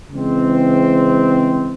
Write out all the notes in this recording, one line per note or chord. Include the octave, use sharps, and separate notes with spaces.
C#3 E3 G#3 C4